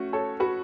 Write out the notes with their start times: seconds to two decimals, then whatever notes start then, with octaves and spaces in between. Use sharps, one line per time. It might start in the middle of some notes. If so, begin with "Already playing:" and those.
Already playing: A3 C#4 F#4
0.13 A4 C#5
0.40 F#4 B4